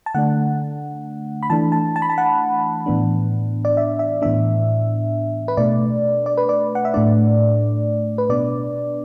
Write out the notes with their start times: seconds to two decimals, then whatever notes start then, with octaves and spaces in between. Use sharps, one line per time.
0.06 A5
0.15 D3 A3 D4 F#5
1.43 B5
1.50 E3 A3 D4 A5
1.72 A5
1.96 A5
2.02 B5
2.09 A5
2.18 F#5
2.86 A2 E3 B3 D4
3.65 D5
3.77 E5
3.99 E5
4.22 A2 E3 B3 D4 E5
5.48 B4
5.57 B2 A3 D4 D5
6.26 D5
6.37 B4
6.49 D5
6.75 F#5
6.85 E5
6.94 A2 A3 D4 D5
8.18 B4
8.29 B2 B3 D4 D5